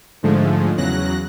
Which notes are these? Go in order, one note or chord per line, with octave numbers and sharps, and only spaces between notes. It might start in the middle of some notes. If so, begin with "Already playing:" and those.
G#2 D3 F3 G#3 A3
E2 C#3 F#3 F#6 A#6